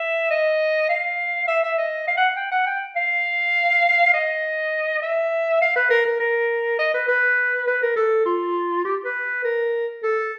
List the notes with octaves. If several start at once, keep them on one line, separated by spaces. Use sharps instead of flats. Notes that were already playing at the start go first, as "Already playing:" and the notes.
Already playing: E5
D#5
F5
E5
E5
D#5
F5
F#5
G5
F#5
G5
F5
D#5
E5
F5
B4
A#4
A#4
A#4
D#5
B4
B4
B4
A#4
A4
F4
G4
B4
A#4
A4